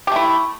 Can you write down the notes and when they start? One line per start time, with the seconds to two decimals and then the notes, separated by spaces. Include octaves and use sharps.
0.07 G4
0.12 A3
0.16 E4